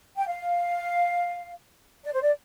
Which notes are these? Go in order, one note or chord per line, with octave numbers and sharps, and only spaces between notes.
G5
F5
D5
C5
D5